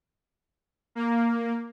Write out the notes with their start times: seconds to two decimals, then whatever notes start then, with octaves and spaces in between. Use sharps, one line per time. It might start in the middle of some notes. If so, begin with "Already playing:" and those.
0.95 A#3